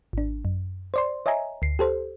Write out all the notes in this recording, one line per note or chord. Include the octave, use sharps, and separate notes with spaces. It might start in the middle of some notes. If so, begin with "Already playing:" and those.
G#1 D4
F#2
C5 D5 C6
C#5 D#5 E5 G#5 A#5
D2 C7
G4 A4 C5